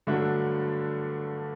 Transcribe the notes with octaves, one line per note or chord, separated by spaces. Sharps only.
G2 D3 F#3 A3 D4